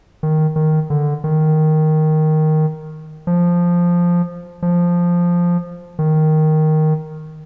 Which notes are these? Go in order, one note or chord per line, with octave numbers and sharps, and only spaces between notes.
D#3
D#3
D3
D#3
F3
F3
D#3